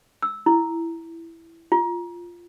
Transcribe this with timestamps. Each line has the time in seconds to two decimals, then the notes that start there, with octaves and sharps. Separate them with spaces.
0.22 E6
0.46 E4
1.72 F4